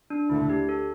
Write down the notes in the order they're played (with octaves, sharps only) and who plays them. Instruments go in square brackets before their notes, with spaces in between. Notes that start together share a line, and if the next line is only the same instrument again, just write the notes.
[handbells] D4
[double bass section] D2 D3 A3 [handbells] E4
[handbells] G4
A4